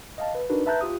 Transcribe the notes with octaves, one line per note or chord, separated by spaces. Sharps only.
D#5 F5 A5
B4
D4 D#4 F#4 A#4 B4
B4 E5 A5 A#5 F#6 G6
F4 G4 D#6